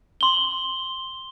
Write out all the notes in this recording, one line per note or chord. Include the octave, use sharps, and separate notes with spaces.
C6 G7